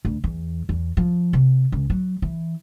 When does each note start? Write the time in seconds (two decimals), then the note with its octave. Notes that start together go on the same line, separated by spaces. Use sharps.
0.05 D2
0.24 E2
0.69 E2
0.97 F3
1.33 C3
1.72 C#2
1.90 F#3
2.22 E3